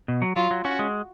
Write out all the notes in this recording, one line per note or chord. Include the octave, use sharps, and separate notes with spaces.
B2
F#3
F#3 F4
F#3
C#4 F#4
G#3